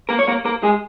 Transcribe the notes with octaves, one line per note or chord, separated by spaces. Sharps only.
A#3 A#4
C#5
A#3 A#4
A#3 A#4
G#3 G#4